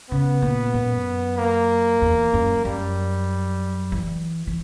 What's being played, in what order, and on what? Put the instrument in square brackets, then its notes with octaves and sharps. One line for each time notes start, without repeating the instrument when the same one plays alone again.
[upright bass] C#3 [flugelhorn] B3
[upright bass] A#2
F#2
[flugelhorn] A#3
[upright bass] E2
F#2
[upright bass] F#2 [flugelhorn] G3
[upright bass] E3
E3